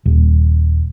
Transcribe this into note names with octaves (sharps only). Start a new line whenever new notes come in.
D#1